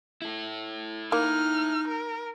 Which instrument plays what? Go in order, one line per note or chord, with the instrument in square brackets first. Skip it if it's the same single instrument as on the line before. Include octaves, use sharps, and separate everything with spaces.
[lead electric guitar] E4 A4
[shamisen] A#3 [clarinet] D#4 [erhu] F6
[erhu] A#4